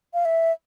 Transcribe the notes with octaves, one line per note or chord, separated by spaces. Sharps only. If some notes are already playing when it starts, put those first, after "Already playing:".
F5
E5